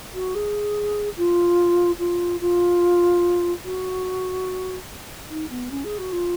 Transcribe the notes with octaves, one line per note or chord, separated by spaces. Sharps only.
F#4
G#4
F4
F4
F4
F#4
D#4
B3
C#4
G#4
F#4
F4